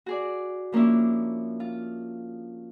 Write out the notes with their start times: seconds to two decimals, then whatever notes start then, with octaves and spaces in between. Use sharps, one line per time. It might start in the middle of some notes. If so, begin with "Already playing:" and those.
0.06 F#4 G#4 D5
0.72 F3 A#3 C#4 D4 E4
1.60 F4